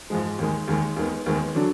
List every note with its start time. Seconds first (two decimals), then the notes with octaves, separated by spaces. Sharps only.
0.10 G#2 F3 G#3
0.38 D#2 D#3 G#3
0.68 D#2 D#3 G#3
0.96 D#2 D#3 G#3 B3
1.26 D#2 D#3 G#3 B3
1.55 D3 F#3 D4